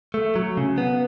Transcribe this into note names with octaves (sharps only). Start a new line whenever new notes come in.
A3
F#3
C#3
B3